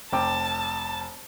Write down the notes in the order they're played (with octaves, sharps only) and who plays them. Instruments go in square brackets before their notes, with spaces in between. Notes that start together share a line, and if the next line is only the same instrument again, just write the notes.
[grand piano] F1 G5 D6 [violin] A5